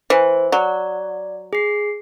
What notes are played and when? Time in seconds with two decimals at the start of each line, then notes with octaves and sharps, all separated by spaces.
0.10 E3 C5
0.52 F#3 D5
1.53 G#4 C7